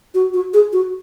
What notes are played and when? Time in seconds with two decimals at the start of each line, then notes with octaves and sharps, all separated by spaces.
0.14 F#4
0.34 F#4
0.54 G#4
0.73 F#4